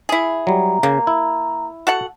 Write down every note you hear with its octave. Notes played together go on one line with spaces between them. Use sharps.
E4 G#4
F#3 G3 A#5
C#3 A#3
E4
F#4 A4 F#5